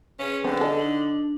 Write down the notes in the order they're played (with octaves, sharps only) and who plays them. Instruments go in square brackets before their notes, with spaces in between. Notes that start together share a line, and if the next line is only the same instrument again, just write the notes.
[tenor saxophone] C#4 [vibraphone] G#4 B4
[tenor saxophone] D3 [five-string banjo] B3 C4
[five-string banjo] A4 D#5
[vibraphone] D4 D#4
D4